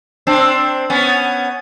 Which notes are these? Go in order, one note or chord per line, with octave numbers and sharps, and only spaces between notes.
C4 D4
B3 C#4